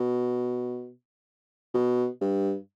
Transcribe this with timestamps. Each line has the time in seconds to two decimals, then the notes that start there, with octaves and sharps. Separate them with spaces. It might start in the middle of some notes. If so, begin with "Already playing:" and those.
Already playing: B2
1.74 B2
2.22 G2